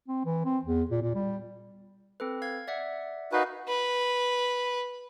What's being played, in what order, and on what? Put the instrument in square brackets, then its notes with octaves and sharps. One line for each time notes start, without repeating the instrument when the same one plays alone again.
[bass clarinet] C4
E3
C4
E2
A#2
A#2
G3
[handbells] C4 A4 B4
F5 G#6
D5 E5 F#5
[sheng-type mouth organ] D#4 F#4 B4 [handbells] A#4 F5 G#5
[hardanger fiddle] B4